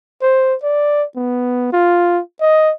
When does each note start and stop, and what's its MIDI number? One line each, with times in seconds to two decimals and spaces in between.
0.22 0.55 72
0.63 1.04 74
1.16 1.71 59
1.73 2.21 65
2.41 2.73 75